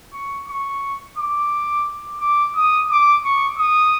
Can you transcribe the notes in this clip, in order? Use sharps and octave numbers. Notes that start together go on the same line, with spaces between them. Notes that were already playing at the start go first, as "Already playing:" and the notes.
C#6
C#6
D6
D6
D#6
D6
C#6
D#6